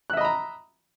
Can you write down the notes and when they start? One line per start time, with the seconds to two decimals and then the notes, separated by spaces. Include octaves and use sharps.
0.10 F#6
0.13 E5
0.17 D#5
0.21 B5
0.24 A#5